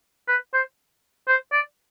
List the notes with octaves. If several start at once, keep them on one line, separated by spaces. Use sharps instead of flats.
B4
C5
C5
D5